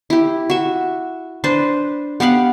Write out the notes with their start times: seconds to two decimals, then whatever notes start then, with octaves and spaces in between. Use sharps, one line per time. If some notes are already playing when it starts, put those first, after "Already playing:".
0.10 E4 G4
0.50 F#4 E5
1.44 D4 B4 C5
2.20 B3 G4 F5 F#5